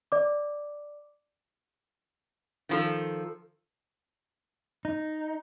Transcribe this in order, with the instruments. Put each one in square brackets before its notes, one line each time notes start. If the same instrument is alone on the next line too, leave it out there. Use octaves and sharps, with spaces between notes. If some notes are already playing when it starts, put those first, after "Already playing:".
[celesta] D5 D6
[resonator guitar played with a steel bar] D#3 F3 A4
[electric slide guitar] D#4